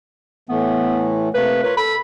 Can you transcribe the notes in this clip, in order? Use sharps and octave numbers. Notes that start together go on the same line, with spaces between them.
A2 E3 A3 B3
C3 A3 A#3 B4
F4 A#4 B4 C#5
A4 B5